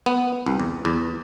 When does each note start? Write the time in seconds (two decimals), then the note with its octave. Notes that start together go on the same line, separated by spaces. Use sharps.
0.06 B3
0.46 C2
0.60 E2
0.85 E2